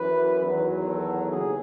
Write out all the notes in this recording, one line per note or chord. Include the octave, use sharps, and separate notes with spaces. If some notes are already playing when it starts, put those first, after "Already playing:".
Already playing: F#2 E3 B4
E2 D#3 F#3
A4
D#2 C#3 G#4